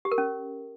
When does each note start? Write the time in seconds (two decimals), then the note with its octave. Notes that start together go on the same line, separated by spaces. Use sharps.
0.05 G4
0.12 A#4
0.18 C#4